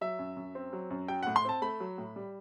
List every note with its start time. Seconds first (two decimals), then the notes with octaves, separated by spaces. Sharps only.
0.01 F#3 E5
0.19 F#2
0.37 F#2
0.55 C4
0.73 F#3
0.90 F#2
1.08 F#3 G5
1.23 A2 F#5
1.36 C6
1.45 C4 A5
1.62 A3 B5
1.80 F#3
1.98 A2
2.16 G3